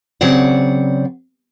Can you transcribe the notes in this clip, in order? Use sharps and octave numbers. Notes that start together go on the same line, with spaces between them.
C#3 F#3 C4 D5 F#5